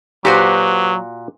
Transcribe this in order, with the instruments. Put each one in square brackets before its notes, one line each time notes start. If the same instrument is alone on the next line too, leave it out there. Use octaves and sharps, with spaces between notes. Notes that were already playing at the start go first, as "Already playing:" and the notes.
[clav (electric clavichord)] A#2 F#4 [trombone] F#3 [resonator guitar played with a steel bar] G4 B4 C5